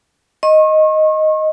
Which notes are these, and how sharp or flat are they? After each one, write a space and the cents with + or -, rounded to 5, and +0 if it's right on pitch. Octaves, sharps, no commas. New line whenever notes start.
D#5 +0 C#6 -40